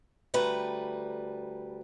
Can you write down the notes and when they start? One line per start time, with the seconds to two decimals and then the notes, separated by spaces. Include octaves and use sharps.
0.34 D2 G3 A3 B4 A#5